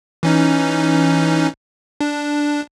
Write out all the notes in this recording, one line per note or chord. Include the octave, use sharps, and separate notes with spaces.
E3 C#4 D#4
D4